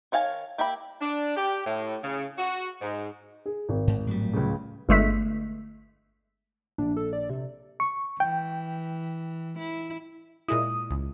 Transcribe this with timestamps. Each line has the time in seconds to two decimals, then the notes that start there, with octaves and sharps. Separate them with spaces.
0.12 D#3 C#5 F5 G#5 A5
0.58 A#3 G4 E5 G5 B5
1.01 D4
1.37 G4
1.66 A2
2.02 C#3
2.37 F#4
2.81 G#2
3.46 G#4
3.69 G#1
3.87 G#2
4.07 A2 F#3 G3
4.33 C#2 C#3
4.89 G1 G#3 A3 B6
6.78 A#1 D4
6.97 A4
7.13 D5
7.30 C3
7.80 C#6
8.20 E3 G5
9.59 E4
10.48 A#2 G#3 E4 D#6
10.91 C#2